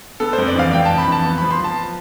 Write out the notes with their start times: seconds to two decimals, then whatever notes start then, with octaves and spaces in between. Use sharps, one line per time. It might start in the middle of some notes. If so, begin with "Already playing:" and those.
0.20 B3 A4
0.33 F2 C5
0.47 D5
0.55 E3 F5
0.73 F2 G5
0.85 F2 A5
0.98 B5
1.07 E3 A5
1.25 B3
1.38 F3 B5
1.51 C6
1.60 F3 A5